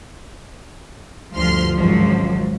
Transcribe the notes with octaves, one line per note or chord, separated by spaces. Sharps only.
D2 G2 F3 C6 F6
G#1 C#2 F3 F#3